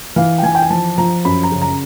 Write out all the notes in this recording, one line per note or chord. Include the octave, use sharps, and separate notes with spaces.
E3 F5
G5
E3 G#5
G5
G#5
F3 A5
F3 A#5
F#2 B5
A#5
C#3
A#5